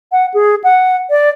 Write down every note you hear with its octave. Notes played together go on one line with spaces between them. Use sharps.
F#5
G#4
F#5
D5